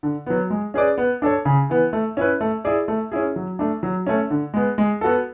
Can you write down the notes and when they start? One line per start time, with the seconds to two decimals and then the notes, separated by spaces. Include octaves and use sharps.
0.03 D3
0.26 F#3 B3
0.50 G#3
0.74 C#4 G#4 B4 D5
0.98 B3
1.22 D4 A4 C#5
1.45 C#3
1.70 E3 B3
1.93 A3
2.17 C#4 E4 B4
2.41 A3
2.65 E4 G#4 D5
2.88 A3
3.12 C#4 E4 G#4
3.36 F#3
3.59 A3 D4
3.83 F#3
4.07 A3 C#4
4.30 D3
4.54 G#3 B3
4.78 G#3
5.01 B3 F#4 A4